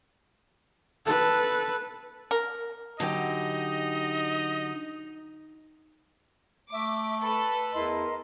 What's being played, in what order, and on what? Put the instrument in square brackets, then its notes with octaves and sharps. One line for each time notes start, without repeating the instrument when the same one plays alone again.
[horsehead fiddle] A4 B4
[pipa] A#4
[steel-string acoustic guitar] D3 F#3 G4 [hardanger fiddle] D#4 [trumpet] D#5
[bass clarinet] A3 [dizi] E5 [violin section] D6
[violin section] A4 B4 [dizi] B5
[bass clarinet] E2 [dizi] E4 [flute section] A#4 D#5 C6